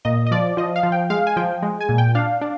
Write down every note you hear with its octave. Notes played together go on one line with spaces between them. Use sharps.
A#2 D#5
D#5
F3 D5
F3 D#5
F5
F3
G5
G#3 F5
G#5
F3 G5
G#3
G#5
A#2
G5
D4 F5
D4